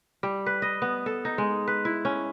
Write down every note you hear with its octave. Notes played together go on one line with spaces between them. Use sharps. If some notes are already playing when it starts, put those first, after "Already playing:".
G3
B4
D#5
B3
A4
D#4
G#3
B4
E4
C#4